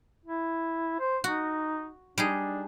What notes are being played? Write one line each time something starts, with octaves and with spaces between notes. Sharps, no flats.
E4
C5
D#4 F#4
G3 D4 D#4 G#4